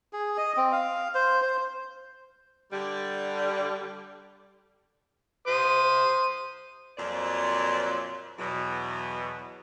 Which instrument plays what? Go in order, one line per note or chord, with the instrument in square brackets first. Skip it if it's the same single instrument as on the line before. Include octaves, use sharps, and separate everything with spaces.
[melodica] G#4
D#5
C4
F5
C5
C5
[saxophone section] D3 G3
[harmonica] C5 D#6
[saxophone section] F2 A#2 F#3 F4 C5 D5
E2 B2 F#3